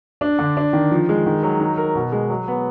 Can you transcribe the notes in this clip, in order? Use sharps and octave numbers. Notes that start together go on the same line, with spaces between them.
D4
D3
D4
D#3
F3
G#3
D#3
F#3
D#4
A#4
B2
G#3
F#3
B3